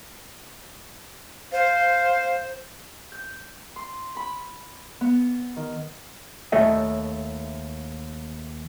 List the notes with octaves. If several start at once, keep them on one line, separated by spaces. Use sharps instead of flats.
C5 F5
G6
C6
B5
B3
D#3
D#2 A3 A4 C#5 D#5 E5